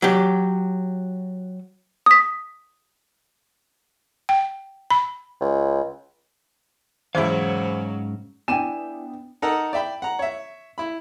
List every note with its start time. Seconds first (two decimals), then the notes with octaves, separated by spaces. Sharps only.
0.02 F#3 G4
2.06 D#6 B6
4.29 G5
4.90 B5
5.41 C#2
7.15 E2 G#2 C#3 F#3 C#4 E4 C5 F5
8.48 B3 D4 E4 D5 G5 G#5 E7
9.42 D#4 A4 A#4 F#5 A#5
9.73 D5 E5 G5 B5
10.02 F#5 A#5
10.19 C#5 E5
10.78 E4 B5